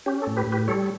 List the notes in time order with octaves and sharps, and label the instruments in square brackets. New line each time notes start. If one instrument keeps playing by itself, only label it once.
[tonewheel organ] C#4 G4
A4
A2
G4 B4
A2
G4 B4
G3 A4 C#5